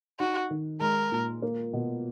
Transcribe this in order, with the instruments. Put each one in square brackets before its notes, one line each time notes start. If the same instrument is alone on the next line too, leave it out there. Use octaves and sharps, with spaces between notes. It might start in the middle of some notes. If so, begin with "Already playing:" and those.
[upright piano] D#4 [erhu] F#4
[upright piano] D#3
[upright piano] G#3 [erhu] A#4
[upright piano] A#2
A#3
B2